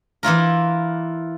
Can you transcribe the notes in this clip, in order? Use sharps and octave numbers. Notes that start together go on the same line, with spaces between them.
E3 E4 F4 A#4